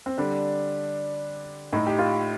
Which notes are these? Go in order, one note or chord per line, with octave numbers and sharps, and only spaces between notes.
C4
D3 G3 D4
A2 A3 D#4
G4
F4